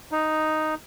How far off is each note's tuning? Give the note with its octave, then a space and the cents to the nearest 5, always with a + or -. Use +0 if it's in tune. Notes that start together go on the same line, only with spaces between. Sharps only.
D#4 +0